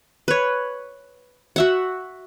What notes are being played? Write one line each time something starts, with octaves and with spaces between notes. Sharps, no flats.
B4 C#5
F#4 E5 F#5